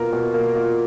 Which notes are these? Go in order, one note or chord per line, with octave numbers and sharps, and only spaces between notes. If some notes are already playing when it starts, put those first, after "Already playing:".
Already playing: B2 A#3 F4 A#4
B2
A#3
F4